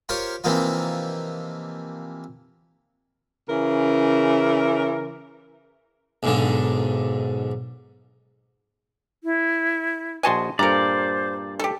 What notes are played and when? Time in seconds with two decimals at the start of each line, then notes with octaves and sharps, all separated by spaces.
0.09 F4 G4 A#4 C5 C#5
0.44 C3 E3 F3 A#3 D#4 F4
3.49 C#3 E3 A#4
6.23 B1 G#2 D3
9.24 E4
10.23 A#1 F#4 D#5 G#5 A5 C6
10.59 G2 A#2 A4 A#4 C5 D5 A#5
11.59 G4 A4